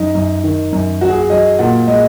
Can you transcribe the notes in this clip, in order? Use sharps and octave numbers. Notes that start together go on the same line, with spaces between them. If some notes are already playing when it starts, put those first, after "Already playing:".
Already playing: F#2 D#4
F#2
D#3
F#2
F#3 F#4
G#4
F#4
F#3 D#5
A#2 F#5
G#3 D#5